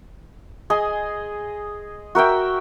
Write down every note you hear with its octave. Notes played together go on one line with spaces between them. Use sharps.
G#4 D#5 G#5 C6
F#4 A#4 E5 G5